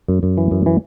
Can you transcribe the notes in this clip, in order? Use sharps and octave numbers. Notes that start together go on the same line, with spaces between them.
F#2
F#2
E3
F#2
E3